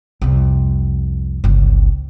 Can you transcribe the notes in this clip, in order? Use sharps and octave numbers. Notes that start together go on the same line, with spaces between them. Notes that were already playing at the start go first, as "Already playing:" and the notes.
C2 F2
G1 C#2